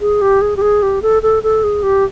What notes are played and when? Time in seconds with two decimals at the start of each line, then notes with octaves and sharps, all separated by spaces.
0.01 G#4
0.22 G4
0.42 G#4
0.57 G4
0.62 G#4
0.83 G4
1.02 A4
1.23 A4
1.43 A4
1.64 G#4
1.83 G4